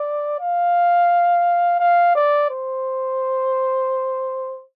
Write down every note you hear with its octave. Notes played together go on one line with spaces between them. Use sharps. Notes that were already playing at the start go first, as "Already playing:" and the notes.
Already playing: D5
F5
F5
D5
C5